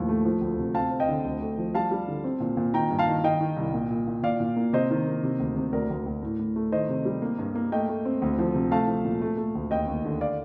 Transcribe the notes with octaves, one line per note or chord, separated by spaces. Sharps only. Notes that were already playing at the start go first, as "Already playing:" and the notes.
Already playing: D#2 A2 F3
A3
F3
D2
C3
C4 F5 A5
C4
D#5 G5
D3
D2
A3
F3
G3 F5 A5
G3
D3
C4
A#2
A#2
D#3 G5 A#5
G2
F5 A5
D#3
D#3 D#5 G5
D#3
C2
A#2
A#2
A#2
A#2 D5 F5
A#2
A#3
C3 C5 D#5
D#3
A#3
C3
D2
C3
D2 A#4 D5
D2
D2
A2
A2
A3
D#3 C5 D#5
C3
G3
A#3
G2
A#3
A3 D#5 G5
A3
C4
D2
F3
C3
A3 F5 A5
F3
A#2
A3
A3
D2
D#2 D#5 G5
D#2
D3
D5 F5